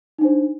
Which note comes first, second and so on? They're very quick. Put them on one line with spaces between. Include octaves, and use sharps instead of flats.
D#4 D4 C5